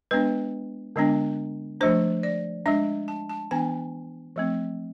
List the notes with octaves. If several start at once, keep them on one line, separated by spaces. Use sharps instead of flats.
G#3 B3 D4 B4
D3 G#3 B3 D4
F3 A3 D4 C5
D5
G#3 D4 E5
A5
A5
E3 B3 D4 G#5
F3 A3 C4